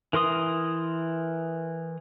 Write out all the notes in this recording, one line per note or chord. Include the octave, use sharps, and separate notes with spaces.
E3 A#4 C6 D#6